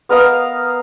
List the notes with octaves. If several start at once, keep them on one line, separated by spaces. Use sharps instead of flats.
B3 A#4 D#5 F5